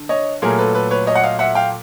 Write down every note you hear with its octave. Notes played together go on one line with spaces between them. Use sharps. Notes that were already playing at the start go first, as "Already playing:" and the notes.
Already playing: D3
C#5 D#5
A#2 F#3 A3 G#4 A#4
A4 B4
A4 B4
B4 C#5
C#5 D#5
F#5
D#5 F5
E5 F#5
F5 G5